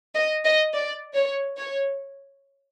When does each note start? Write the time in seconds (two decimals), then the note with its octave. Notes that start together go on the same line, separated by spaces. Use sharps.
0.15 D#5
0.44 D#5
0.73 D5
1.15 C#5
1.58 C#5